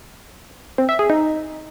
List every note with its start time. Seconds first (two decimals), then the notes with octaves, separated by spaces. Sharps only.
0.78 C4
0.89 E5
0.99 G#4
1.10 D#4